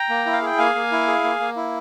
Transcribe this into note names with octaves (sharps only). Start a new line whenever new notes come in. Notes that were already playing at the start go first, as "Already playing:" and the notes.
Already playing: G5 A#5
A#3
E4
F5
G#4 G5
A#3 F5 G#5
A#3
E4
G#4
A#3
A#3
E4